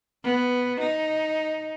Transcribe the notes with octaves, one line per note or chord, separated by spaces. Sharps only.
B3
D#4